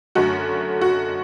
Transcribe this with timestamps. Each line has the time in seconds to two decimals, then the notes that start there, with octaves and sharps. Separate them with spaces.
0.15 F#2 D3 A3 F#4
0.81 F#4